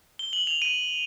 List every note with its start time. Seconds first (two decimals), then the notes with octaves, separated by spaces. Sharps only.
0.19 G7
0.33 F#7
0.47 F7
0.62 D#7